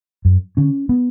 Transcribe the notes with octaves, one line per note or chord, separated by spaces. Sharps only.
F#2
D3 C#4
B3